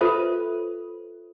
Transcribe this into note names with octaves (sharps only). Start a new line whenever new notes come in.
F4 A4 B4 C5 E5